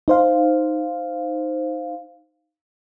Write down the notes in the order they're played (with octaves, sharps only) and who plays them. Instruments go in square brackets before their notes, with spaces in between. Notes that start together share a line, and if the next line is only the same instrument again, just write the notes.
[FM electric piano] D#4 C5 F5